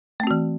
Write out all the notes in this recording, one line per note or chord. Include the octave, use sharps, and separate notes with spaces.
E3 A3 C4 F#4